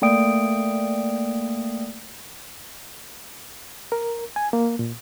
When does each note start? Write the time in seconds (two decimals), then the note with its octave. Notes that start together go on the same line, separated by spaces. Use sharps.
0.02 A3 A#3 D5 G5 D#6 D7
3.92 A#4
4.36 G#5
4.53 A#3
4.79 A#2